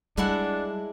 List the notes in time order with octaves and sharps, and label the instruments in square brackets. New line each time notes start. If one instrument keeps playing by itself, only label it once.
[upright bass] G3 [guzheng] G#3 E4 F#5 [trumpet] D4